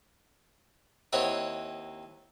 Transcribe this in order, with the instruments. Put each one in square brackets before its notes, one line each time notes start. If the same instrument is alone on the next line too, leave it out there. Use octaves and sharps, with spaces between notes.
[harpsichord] D#2 C4 D#4 E4 C#5 F#5